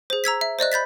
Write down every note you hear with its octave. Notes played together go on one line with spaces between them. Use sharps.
G#4 C5
A#5 E6 G#6 B6
E5
C5 D5 D#5 F#6
B5 G6 A6 B6